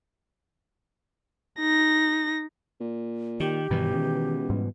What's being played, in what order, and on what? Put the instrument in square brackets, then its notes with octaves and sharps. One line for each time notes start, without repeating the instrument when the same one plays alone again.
[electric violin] D#4 A#6
[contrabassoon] A#2
[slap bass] D#3 [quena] G4
[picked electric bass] G2 D#3 [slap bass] B2 E3
[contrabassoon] C#2 [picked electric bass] D#3
[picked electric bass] G#2 G3